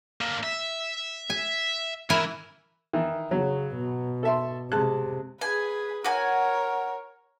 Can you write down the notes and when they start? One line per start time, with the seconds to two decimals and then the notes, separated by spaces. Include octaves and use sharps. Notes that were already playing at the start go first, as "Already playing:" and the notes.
0.21 D3 A#3
0.43 E5
1.30 G#5
2.10 E3 E4 A#4 G#5
2.93 D#3 E3
3.31 C#3 F#3
3.76 B2
4.23 A4 E5 C6
4.72 C3 G#3 A5 F#6
5.41 G#4 B4 G#5
6.04 F#4 A#4 C#5 G#5